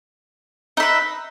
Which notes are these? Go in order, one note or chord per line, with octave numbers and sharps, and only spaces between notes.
D#4 B4 E5